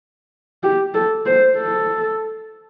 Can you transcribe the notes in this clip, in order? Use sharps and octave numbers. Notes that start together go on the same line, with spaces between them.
G4
A4
C5
A4